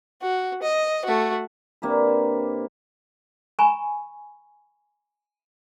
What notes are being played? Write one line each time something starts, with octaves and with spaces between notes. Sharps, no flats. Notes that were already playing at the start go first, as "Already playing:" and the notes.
F#4
D#5
A3 F#4
C3 A#3 D4 B4
G#5 A#5 B5 C#6